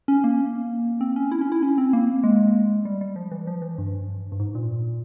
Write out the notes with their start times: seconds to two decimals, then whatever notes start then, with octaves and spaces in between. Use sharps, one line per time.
0.08 C#4
0.24 A#3
1.01 C4
1.16 C#4
1.32 E4
1.41 C#4
1.52 E4
1.63 C#4
1.78 C4
1.93 A#3
2.24 G#3
2.85 G3
3.01 G3
3.16 F3
3.31 E3
3.47 F3
3.62 E3
3.78 G2
4.32 G2
4.40 G#2
4.55 A#2